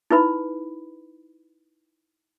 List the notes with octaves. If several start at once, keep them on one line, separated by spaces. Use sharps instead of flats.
D#4 E4 B4 B5